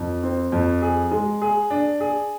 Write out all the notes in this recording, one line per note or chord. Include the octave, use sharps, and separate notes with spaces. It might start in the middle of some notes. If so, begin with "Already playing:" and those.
Already playing: F2
C4
F2
G#4
G#3
G#4
D4
G#4